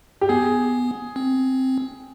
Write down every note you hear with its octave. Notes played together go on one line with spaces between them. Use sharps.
G4
B3 G#4
C4